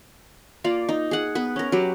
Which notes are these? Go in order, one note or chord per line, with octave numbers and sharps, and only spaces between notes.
A#3 F4 D5
D#4
G#4 F#5
B3 B4
C#4 A#4
F#3 G4 B4